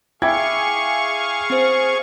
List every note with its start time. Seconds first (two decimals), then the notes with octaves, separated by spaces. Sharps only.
0.22 E4 G#4 F5 G5 G#5 C#6 D6 G#6
1.50 C4 C5